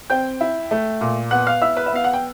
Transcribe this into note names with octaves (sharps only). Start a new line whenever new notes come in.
C4 G5 G6
E4
A3
A#2
B3 F#5 F#6
F5 F6
E4 E5 E6
B4 B5
E5
B3 F5
F#5
G5